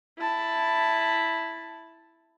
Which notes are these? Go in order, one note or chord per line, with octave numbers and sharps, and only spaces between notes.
E4 A5